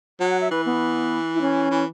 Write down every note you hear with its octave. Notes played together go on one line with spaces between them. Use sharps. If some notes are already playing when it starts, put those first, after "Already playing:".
F#3 F#5
F#5
E5
E3 B4
B3
E4
C#4
E3